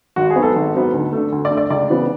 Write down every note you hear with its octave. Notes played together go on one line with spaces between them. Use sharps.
G#1 F#4
G#4
G#2 F#3 B3
A4
G#1
G#2 F#3 B3
D2
D3 A3
D2
D5
D3 A3
D5
C#2 D5
C#3 E3 B3